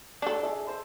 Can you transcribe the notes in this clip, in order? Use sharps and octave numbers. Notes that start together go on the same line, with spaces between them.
D4 A4
G#4 E5 A5
C5 C6